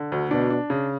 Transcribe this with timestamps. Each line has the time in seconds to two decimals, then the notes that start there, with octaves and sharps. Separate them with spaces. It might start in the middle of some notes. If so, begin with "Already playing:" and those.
Already playing: D3
0.12 D2
0.31 B2 D4
0.50 D4
0.70 C#3